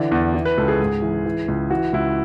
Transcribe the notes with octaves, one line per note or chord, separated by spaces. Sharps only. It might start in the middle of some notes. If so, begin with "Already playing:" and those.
Already playing: D3 E3 D5
E2
E3
B4
C#2 A4
G#4
G#2
E3
E3
C#2
E3 F#4
C#2 E4